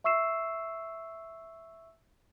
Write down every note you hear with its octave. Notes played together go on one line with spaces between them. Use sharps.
E5 C#6 E6 C7 E7